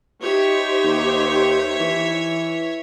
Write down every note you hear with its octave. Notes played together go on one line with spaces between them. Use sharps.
D#4 G4 C5 C#5 E5
D#2
E3